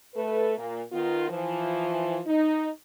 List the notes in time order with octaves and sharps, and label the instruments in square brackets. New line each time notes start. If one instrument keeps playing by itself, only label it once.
[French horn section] A3 A4 B4
A#2 A#3
D#3 B3 F4
E3 F3
D#4